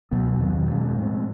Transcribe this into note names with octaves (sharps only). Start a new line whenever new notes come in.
C#2 B2 F#3 B3
E2 C3 D#3 F#3
B2 G#3 C#4
A2 F3 G#3 C4